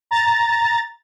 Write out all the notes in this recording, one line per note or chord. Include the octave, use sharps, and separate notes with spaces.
A#5 A6